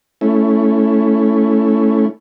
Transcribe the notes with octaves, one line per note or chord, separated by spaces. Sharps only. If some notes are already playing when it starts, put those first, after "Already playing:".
A3 C#4 E4